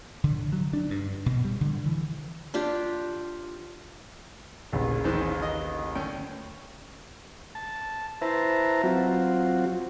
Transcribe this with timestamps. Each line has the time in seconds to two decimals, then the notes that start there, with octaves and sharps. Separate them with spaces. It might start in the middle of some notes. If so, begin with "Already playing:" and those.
0.24 D3
0.52 F#3
0.73 D4
0.90 G2
1.26 B2
1.45 G3
1.61 D3
1.86 E3
2.54 D4 F4 G4
4.72 A1 D#2 C#3
5.04 D#3 E3 C5
5.42 D#5
5.95 D2 C#4 G5
7.55 A5
8.22 E4 B4 C5 E5 A5 A#5
8.83 F#3 C4 F4 F#4